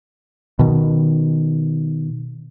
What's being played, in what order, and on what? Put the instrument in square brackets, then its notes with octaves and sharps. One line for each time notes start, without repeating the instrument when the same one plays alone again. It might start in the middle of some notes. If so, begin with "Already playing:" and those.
[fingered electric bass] B2 D#3